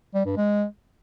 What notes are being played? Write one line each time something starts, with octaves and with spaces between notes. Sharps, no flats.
G3
G2
G#3